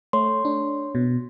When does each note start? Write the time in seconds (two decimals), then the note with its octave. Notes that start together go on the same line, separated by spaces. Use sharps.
0.13 A3 C#5 C6
0.45 D4
0.95 B2